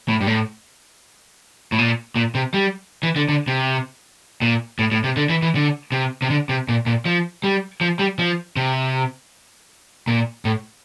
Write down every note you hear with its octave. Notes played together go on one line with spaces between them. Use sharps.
A2
G2
A2
A2
A#2
A#2
C3
G3
E3
D3
D3
C3
A#2
A2
A2
C3
D3
E3
E3
D3
C3
C3
D3
C3
A#2
A#2
F3
G3
F3
G3
F3
C3
A#2
A2